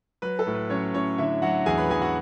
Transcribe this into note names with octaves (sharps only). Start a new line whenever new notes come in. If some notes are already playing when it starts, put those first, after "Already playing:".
F#3 B4
A4
A2
B4
F#3 C#4 C#5
A2 C#4 C#5
D3 E4 E5
F#3 F#4 F#5
E2 G#4 G#5
B4 B5
E2 G#4 G#5
F#4 F#5